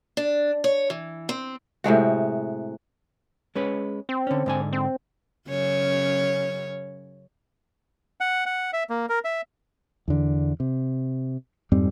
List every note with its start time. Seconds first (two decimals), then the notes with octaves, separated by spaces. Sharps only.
0.17 D4
0.64 C#5
0.90 E3
1.29 C4
1.84 A2 C3 G#3 F#4
3.55 G#3 C#4 B4
4.09 C4
4.27 D3 C#4
4.46 G#2 D3 G#5
4.73 C4
5.48 F#2 C#3 C#5
8.21 F#5
8.46 F#5
8.73 E5
8.90 A#3
9.09 A#4
9.24 E5
10.08 E2 D3
10.60 C3
11.72 F2 G#2 G3 C4